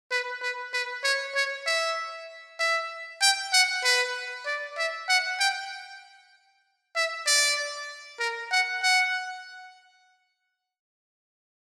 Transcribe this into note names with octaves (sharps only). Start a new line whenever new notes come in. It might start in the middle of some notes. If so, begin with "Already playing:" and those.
B4
B4
B4
C#5
C#5
E5
E5
G5
F#5
B4
D5
E5
F#5
G5
E5
D5
A#4
F#5
F#5